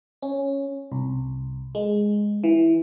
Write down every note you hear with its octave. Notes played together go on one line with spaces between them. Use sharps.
C#4
C2
G#3
E3